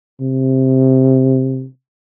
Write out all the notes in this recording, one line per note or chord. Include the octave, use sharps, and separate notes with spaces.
C3